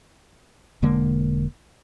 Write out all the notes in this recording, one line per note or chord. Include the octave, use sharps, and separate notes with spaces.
E1 D3 G#3 A#3